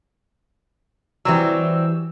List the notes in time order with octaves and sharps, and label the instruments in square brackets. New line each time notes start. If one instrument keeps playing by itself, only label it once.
[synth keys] E3 E6 [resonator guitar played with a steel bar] F#3 G3 C4